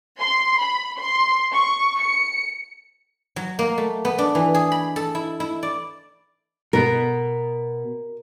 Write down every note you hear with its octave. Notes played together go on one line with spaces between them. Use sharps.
C6
B5
C6
C#6
C#7
F#3
A#3
A3
B3
D4
E3
G#4
B5
A4
E4
E4
D5
B2 B3 A#4